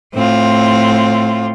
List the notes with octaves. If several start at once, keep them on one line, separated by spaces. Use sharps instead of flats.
A2 C4 F4